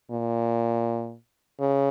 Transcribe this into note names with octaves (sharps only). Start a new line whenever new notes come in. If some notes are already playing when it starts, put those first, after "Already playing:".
A#2
C#3